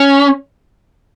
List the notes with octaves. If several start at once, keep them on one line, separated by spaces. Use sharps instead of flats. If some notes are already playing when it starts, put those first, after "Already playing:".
Already playing: C#4